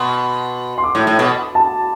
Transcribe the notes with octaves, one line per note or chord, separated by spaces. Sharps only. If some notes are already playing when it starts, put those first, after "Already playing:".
Already playing: B2 C6
C6
D6
A2
A2
B2
B5
A5